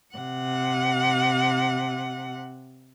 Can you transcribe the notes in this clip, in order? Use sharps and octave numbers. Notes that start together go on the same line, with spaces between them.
C3 F#5